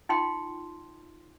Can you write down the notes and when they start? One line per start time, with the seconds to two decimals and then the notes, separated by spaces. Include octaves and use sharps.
0.09 D#4 F4 G5 C6